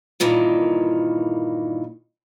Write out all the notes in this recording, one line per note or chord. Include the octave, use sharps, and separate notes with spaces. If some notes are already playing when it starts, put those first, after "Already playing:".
G2 A#2 D#3 E3